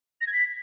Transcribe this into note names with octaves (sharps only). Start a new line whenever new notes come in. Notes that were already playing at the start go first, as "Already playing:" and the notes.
A#6
G#6
B6